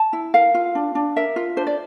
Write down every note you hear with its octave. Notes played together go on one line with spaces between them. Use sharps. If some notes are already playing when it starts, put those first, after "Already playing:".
Already playing: A5
E4
A#4 F5
F4
D4
D4
A#4 E5
F4
D4 C5
D5